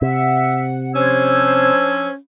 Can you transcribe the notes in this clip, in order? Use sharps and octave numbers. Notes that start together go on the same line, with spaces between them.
C3 E5 F#5
F3 C#4 D4 C5 E6 G#6